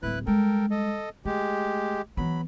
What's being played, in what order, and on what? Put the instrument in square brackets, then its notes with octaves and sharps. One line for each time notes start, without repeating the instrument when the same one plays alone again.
[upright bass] D1 F#3 [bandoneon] E4 B4 F#6
[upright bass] G3 G#3 [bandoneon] A4 A#4 G5
[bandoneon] A4 D#5
[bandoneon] G#3 G4 [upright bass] A3
[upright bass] E3 B3 [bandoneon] F#3 B5